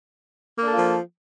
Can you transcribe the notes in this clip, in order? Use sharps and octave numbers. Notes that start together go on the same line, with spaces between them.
F3 A#3 D4 F4 A4